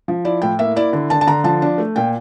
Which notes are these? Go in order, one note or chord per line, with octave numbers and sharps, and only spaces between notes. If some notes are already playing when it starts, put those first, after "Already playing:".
F3
E4 D5
A2 G5
A#3 E5
E4 D5
D3
D3 A5
A5
D3 A#5
F3 A5
D4
A3
A#2 G5